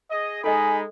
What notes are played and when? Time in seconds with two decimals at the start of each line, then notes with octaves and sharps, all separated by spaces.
0.11 G#4 D#5
0.44 G#3 D#4 A4 D#5 G#5 B5